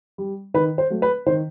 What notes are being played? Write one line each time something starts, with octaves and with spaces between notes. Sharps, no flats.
G3
D#3 B4
C5
F#3 A3
B4
D#3 C5